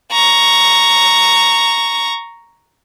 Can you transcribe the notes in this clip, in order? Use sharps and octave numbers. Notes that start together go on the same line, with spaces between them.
A#5 C#6